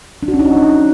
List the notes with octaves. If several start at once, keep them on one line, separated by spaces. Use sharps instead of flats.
D4
F#4
C#4
D#4
F#4